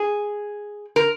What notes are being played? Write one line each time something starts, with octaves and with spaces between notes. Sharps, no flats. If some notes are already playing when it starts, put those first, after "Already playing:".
Already playing: G#4
A#4